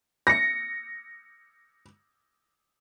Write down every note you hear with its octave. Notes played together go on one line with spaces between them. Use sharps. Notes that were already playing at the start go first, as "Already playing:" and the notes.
A#6 C#7